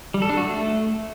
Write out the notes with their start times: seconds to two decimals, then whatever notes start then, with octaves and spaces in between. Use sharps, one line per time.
0.14 G3
0.22 A4
0.30 D4
0.37 F#4
0.45 A3